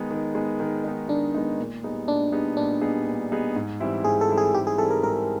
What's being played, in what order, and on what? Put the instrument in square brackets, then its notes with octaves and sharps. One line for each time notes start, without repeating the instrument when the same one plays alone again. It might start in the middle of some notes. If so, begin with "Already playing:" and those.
Already playing: [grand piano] D#3 G#3 B3 D#4
D#3
G#3 B3 D#4
D#3
G#3 B3 D#4
[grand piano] D#3 [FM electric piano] D4
[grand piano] G#3 B3 D#4
A#2
G3 B3 D#4 G#4
[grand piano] A#2 [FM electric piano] D4
[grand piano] G3 B3 D#4 G#4
[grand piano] A#2 [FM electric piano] D4
[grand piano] G3 B3 D#4 G#4
A#2
G3 B3 D#4 G#4
G#2
E3 G3 C4 E4
[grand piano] G#2 [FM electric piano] G#4
[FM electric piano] A4
[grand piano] E3 G3 C4 E4
[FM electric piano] G#4
[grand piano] G#2 [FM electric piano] G4
[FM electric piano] G#4
[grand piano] E3 G3 C4 E4 [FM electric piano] A4
[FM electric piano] A#4
[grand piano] G#2 [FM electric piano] A#4